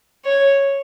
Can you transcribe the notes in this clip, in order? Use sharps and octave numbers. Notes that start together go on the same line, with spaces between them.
C#5